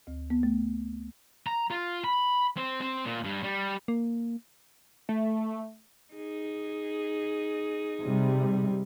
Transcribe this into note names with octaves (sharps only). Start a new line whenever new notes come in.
D2
B3
A3
A#5
F4
B5
C4
C4
A#2
G2
G3
A#3
A3
D#4 G#4
C3 G3